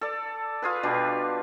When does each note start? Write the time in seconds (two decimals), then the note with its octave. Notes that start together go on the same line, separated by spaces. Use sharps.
0.01 A4 D5
0.62 F4 G#4 B4
0.83 B2 G3 D4